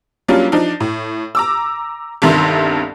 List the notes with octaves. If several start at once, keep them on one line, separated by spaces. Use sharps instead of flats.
F#3 G3 A#3 C#4 D4 F4
F3 D4 D#4
A2
A#5 D6 E6
G1 C2 G2 D#3 E5 C6